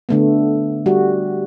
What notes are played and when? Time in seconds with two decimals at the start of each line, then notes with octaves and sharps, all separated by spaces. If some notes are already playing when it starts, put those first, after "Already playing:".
0.09 D3 A3 B3
0.86 G3 F#4